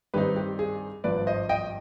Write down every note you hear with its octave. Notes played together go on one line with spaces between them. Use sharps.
G2 D#3 G3 C4 D#4 G4 B4
G4
G#4
G#1 G2 F3 B4 D5
C5 D#5
D#5 G5